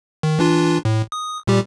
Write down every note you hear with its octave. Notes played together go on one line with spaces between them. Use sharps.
D#3
E3 D4 F4
A2
D#6
A#2 G3 G4